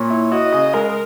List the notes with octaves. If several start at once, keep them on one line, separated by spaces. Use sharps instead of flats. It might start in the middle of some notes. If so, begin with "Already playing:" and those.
Already playing: A#2 C#5
E4
F#4 D#5
C#3
G#3 A#4